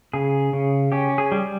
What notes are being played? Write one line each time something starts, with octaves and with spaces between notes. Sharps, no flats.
C#3 G#4
C#3
C#4 G4
G#4
G3